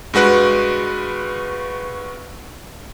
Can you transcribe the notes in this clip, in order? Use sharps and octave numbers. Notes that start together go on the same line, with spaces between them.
G2 G#3 F#4 B4 F#6